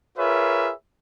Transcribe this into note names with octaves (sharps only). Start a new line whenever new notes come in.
F4 G#4 A#4 B4 C#5 E5